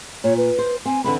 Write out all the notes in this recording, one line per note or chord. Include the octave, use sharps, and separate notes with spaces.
A#2 C#5
B4
C5
C4 G#5
D3 E3 C4 B5